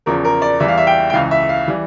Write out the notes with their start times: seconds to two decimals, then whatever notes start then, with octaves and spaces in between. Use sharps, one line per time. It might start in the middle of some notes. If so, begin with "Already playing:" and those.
0.06 E2 C#3 F3 A#4
0.25 A#4
0.42 D5
0.60 E2 E3 G3 E5
0.68 F5
0.77 E5
0.87 G5
1.10 G5
1.13 C#2 C#3 E3 F5
1.31 E5
1.49 F5
1.68 E3 G3